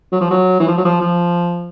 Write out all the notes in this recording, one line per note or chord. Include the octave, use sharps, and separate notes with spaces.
F#3
F3
F#3
E3
F3
F#3
F3
F3